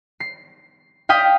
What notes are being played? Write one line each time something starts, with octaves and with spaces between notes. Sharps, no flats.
C7
F5 G5 D#6 B6